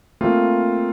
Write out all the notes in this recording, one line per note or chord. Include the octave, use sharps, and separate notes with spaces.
A3 A#3 C4 F4